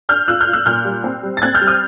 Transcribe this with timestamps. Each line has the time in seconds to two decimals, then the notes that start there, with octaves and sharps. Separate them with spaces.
0.09 D4 F6 G6
0.28 F4 E6 F#6
0.41 F6 G6
0.47 F4
0.53 E6 F#6
0.66 A#2 F6 G6
0.85 G3
1.04 C4
1.23 G3
1.37 A6
1.42 C4 F#6 G#6
1.55 F6 G6
1.61 G3
1.67 D#6 F6